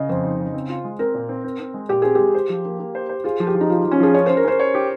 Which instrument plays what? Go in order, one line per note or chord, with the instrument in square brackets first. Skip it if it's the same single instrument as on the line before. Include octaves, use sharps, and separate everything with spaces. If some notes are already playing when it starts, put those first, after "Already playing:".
Already playing: [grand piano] C#3 [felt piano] D#5
[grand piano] F2 [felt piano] C5
[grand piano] D#4
C#3
C4
F4
G#3
[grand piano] C4 [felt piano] A#4
[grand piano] A#2
C4
C4
C4
G#3
[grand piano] A#2 [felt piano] G4
[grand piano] C4 [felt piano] G#4
[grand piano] G#3 [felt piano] G4
[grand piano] C5
F3
A#3
A#3
C5
C5
[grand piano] F4 [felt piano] G#4
[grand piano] F3
[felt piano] G4
[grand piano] F3
[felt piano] D#4
[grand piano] F3 [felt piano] F4
[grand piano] F3
[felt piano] C#4
[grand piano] F3 [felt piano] G#4
[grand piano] C#4 [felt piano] C#5
[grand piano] C#4 [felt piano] C5
[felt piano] A#4
[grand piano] C#4 [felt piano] C5
[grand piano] C#5
G4